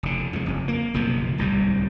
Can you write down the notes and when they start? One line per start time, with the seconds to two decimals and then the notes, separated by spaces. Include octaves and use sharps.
0.03 F1 D3
0.33 F2 G#3
0.46 F#1 F2
0.68 A#3
0.94 F#1 B1 C3 F3
1.38 D1 C2 G#2 G3